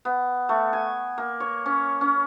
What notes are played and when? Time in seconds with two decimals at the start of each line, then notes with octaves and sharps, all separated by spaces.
0.05 B3
0.49 A3
0.73 G#5
1.18 A#3
1.40 C#5
1.66 C#4
2.01 C#4